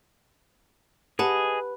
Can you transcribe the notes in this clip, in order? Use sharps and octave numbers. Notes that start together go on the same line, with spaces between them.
G4 G#4 B4 D#5 F#5 A5